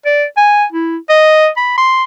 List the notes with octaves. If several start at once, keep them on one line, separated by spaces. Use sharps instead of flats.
D5
G#5
E4
D#5
B5
C6